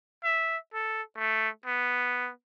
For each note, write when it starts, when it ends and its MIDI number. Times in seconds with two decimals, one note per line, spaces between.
0.24 0.57 76
0.73 1.02 69
1.17 1.49 57
1.66 2.30 59